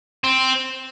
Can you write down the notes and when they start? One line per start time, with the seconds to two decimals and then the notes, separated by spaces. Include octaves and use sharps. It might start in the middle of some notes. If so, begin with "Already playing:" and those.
0.24 C4